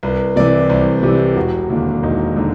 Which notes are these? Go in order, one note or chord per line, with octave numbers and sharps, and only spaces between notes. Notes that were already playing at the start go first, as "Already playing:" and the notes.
C2 B4
C3 E3 D5
C2 C5
C3 E3 G4
E1 F#4
D#2 D3
E1 D#4
D3 D#4